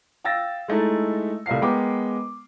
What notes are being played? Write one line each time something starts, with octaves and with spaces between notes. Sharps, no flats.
F5 G5 E6 A6 A#6
G#3 A3 D#4 E4
C2 A3 A#4 F5 C7
G#3 B3 A#4 G5 D6